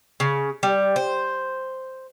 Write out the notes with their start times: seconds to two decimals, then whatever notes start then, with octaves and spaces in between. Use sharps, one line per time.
0.20 C#3
0.63 G3
0.96 C5